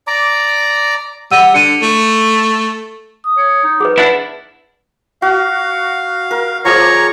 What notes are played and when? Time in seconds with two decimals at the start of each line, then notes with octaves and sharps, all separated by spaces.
0.07 D5 A#5 D6
1.31 G3 F#5 E6 D#7
1.54 D3 C#7 D#7
1.82 A3
3.24 D#6
3.37 C#5
3.64 D#4
3.80 G#4 B4
3.98 D4 E4 B4 F#5
5.22 F#4 F5
6.31 A#4
6.65 F3 G#4 C#5 D5 A#5 C#6